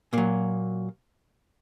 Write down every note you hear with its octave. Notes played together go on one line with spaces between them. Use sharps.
A#2 F#3 A#3